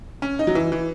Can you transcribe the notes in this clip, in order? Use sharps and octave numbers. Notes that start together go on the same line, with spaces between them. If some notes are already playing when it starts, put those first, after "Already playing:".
C#4
D#4
F#3
E3
E3